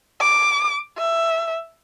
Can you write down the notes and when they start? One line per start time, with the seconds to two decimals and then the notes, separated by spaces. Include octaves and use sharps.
0.21 D6
0.98 E5